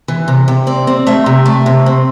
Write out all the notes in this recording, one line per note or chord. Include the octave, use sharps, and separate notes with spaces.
E3
C3
C3
C4 D5
C4
A3 E5
C3
A3
C3
C4